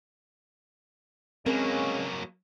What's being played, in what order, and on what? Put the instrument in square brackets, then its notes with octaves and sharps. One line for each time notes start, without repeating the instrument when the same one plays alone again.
[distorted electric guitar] F#3 A#3 [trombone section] G#3 C#4 [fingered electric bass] C4 [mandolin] A#4 B4